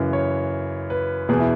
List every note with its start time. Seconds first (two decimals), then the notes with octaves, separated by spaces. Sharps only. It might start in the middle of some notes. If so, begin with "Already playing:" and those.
Already playing: F#2 C#3 E3 B4
0.13 C#5
0.90 B4
1.29 E2 B2 G#4
1.40 E4